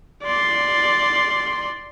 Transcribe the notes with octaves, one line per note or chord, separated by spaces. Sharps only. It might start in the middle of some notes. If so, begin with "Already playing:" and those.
D5 C6